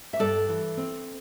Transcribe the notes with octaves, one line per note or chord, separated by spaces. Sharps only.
E5
G2 A4 D5
E3
C4